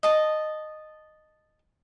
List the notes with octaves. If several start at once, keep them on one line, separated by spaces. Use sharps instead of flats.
D#5 A5